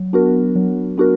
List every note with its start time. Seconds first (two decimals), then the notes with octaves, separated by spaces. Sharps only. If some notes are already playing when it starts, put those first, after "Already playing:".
Already playing: F#3
0.13 B3 D4 F#4 A#4
0.56 F#3
0.98 B3 D4 F#4 A#4